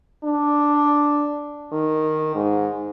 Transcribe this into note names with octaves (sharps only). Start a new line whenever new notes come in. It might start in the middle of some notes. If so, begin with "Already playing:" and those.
D4
D#3
G#2